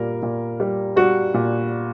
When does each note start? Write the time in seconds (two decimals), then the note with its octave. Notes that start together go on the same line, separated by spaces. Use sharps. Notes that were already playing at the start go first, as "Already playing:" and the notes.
Already playing: A#2 G3 A#4
0.23 A#2
0.60 G3
0.96 G3 F#4
1.34 A#2